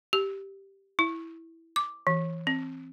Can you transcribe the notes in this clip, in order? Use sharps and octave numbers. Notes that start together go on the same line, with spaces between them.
G4
E4
D6
E3
C4